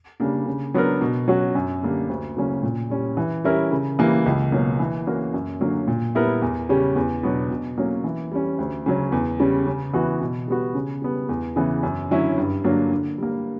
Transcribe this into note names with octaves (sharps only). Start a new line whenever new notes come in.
C#3 G3 A#3 D4
C#3
F#3 B3 D4 A#4
B2
F#3 C#4 F#4
F#2
D3 G3 A#3 D4
D2
C#3 F#3 A#3 C#4
A#2
G3 C#4
E3
G3 C#4 E4 A#4
C#3
E3 G3 A#3
C#2
B2 F#3 A#3
E3
A#3 C#4 F#4 A#4
F#2
D3 F#3 A#3 C#4
A#2
G3 B3 E4 A#4
E2
C#3 G3 C#4 G4
E2
B2 F#3 B3 D4
B2
F#3 A#3 C#4
E3
G3 C#4
D2
C#3 F#3 C#4
E2
C#3 G3 C#4
C#3
E3 B3 F#4
B2
G3 B3 F#4
C#3
G3 B3
E2
C#3 E3 B3
F#2
D3 F#3 C#4 E4
G2
D3 F#3 A#3 D4
D3
G3 A#3